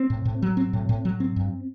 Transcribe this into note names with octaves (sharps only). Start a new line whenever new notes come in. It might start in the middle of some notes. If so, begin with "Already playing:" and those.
Already playing: C4
A2
A2
F#3
C4
A2
A2
F#3
C4
G2